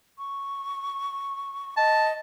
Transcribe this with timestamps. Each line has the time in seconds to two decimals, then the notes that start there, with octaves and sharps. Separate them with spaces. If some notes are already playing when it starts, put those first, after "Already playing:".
0.18 C#6
1.77 D#5 A5